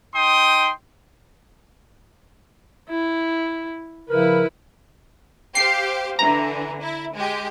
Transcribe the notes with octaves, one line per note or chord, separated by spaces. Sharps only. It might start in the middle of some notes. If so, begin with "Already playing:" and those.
D#4 G5 C6 D#6
E4
C#3 F3 E4 A#4 B4
G4 C5 F5 C7
D3 E3 A#5
E4
G#3 G4